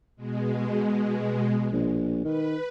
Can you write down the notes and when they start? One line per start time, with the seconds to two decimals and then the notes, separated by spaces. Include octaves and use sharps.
0.16 B2 G#3
1.72 A#1
2.25 D#3 B4